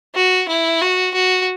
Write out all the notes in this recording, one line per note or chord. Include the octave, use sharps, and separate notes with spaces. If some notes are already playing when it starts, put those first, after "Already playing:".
F#4
E4
F#4
F#4